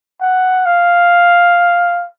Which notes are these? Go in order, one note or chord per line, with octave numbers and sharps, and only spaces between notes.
F#5
F5